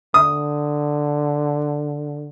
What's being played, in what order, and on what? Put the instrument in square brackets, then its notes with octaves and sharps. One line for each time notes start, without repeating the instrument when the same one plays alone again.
[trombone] D3 [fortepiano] D#6